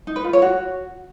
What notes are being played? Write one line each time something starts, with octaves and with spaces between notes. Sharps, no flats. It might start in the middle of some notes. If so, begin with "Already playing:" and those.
D#4
B4
F4
C#5
F#4